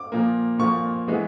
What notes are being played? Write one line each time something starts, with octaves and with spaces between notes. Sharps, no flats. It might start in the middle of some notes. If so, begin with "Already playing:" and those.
Already playing: D6
A#2 F3 A#3
A#2 F3 A#3 C#6
E3 G#3 B3